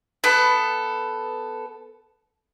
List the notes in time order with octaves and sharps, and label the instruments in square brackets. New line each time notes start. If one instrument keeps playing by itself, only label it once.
[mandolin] B3 A4